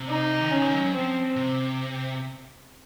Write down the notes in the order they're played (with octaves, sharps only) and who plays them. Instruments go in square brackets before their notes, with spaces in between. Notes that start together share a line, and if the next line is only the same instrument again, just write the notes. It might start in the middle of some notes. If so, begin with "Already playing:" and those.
Already playing: [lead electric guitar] C3
[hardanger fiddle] D#4
[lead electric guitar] D#3
[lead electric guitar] C#3 [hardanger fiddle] C#4
[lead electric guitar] D#3
F#3
F#3
[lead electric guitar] F3 [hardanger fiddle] C4
[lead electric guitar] C3